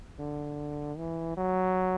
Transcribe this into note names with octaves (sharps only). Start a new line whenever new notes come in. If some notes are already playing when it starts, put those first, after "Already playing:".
D3
E3
F#3